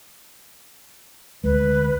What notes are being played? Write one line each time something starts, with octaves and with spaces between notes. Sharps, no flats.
D2 G#3 B4